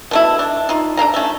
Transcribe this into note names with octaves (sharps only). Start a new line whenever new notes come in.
B2 A3 E4
D4
D#4 F4
D4 A4 F5 A#5
A3 C#4